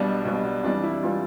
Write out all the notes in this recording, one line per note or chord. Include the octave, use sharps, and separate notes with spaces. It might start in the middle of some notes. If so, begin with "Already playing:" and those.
Already playing: B1 B2 G3 D4
B1 B2 G3
F2 E3 G3 D4
E4
E3 G3 F4